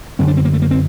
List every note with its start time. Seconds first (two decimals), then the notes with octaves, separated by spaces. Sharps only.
0.19 F#2 D3 C4
0.28 D4
0.37 C4
0.45 A#3
0.53 A3
0.62 A#3
0.71 C4